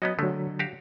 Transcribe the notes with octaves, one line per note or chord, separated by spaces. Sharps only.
F#3 B3 C#4 F#4 D#5
D3 F#3 G#3 A3
F#4 G4 F5